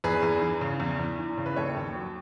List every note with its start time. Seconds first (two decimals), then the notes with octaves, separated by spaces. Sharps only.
0.04 E2 G#4 B4
0.23 E2
0.42 E3
0.61 C#3
0.80 E2
0.99 E2
1.19 E3
1.37 C#3
1.46 B4
1.56 D#2 A4 C#5
1.76 D#2
1.95 F#3